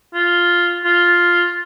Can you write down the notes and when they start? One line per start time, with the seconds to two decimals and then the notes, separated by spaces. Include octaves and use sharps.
0.14 F4
0.84 F4